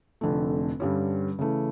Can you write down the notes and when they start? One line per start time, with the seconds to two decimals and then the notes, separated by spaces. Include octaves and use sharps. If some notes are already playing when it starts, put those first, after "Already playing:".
0.21 F1 F2 D3 A3
0.80 G2 D3 G3 C#4
1.39 C#3 E3 A3